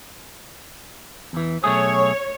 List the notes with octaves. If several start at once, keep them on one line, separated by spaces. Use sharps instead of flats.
E2 E3
B1 A3 G#4 C#5